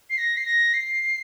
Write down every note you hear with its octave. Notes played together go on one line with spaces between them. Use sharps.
C7
A#6
C7
A#6
C7